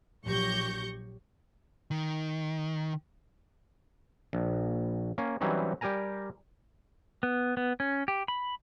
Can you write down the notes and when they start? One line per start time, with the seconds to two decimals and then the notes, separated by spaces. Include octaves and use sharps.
0.25 A#1 F#3 G4 C#6 G6 A#6
1.91 D#3
4.33 A#1
5.18 A#3 C#4
5.41 E3 F#3 G3 C4 C#4 D#4
5.81 G3 G4 A#4 G#5 A#5
7.23 B3
7.57 B3
7.80 C#4
8.08 G4
8.28 B5